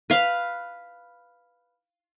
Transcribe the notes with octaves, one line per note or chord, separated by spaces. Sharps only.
B4 F5